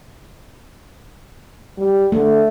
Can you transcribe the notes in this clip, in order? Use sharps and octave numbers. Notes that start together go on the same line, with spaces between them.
G3
D3 A3